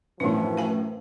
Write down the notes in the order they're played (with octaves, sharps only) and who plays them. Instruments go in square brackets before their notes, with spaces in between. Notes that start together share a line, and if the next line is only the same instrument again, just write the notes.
[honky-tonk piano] F#2 A2 [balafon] E3 D4 [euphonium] F3 [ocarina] B4
[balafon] F5 G#5 A5